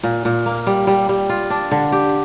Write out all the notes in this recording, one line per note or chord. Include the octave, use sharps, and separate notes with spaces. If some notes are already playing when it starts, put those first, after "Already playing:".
A#2
A#2
A#3
G3
G3
G3
F4
D4
D3
G4